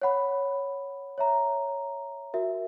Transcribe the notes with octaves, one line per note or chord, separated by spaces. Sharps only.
C#5 F#5 B5
C#5 E5 A#5
F#4 A#4 E5